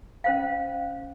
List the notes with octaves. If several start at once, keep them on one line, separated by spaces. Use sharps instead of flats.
C#4 C5 F5